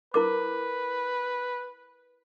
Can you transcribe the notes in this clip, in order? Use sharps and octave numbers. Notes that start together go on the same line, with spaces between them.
E4 A#4 B4 D6